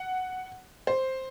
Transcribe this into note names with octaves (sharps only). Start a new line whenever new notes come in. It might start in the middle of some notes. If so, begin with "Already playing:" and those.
Already playing: F#5
C5